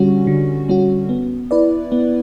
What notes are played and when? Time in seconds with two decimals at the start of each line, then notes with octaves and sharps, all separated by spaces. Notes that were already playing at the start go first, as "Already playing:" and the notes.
Already playing: D3 G3 C#4 F#4
0.27 D3
0.69 G3 C#4 F#4
1.09 B3
1.51 E4 B4 D5
1.92 B3